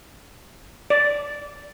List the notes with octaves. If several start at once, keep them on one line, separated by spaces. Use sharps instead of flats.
D5